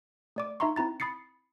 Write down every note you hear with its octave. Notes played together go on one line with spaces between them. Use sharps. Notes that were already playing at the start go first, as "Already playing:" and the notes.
A3 D5 D6
D#4 E5 A#5 C6 C#6
C4 E4 A#5 A6
B5 D#6 A6 C7 C#7